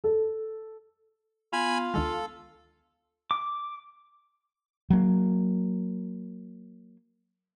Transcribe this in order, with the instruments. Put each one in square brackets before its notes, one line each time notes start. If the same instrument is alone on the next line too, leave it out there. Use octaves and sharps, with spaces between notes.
[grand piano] A4
[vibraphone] B3 [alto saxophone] F4 [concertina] G#5 B5
[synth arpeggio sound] D2 D#3 G#3 [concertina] A4 [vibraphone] F5
[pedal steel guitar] D6
[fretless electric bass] F#3 A#3